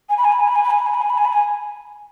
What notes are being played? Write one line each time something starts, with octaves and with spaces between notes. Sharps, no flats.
G#5
B5
G#5
B5
G#5
B5
G#5
B5
G#5
B5
G#5
B5
G#5
B5
G#5
B5
G#5